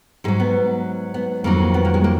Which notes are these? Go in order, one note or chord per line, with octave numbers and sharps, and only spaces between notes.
G#2 F#3 G#3
B3
B3
F2 D#3 F#3 A#3
B3
A#3
G#3
A#3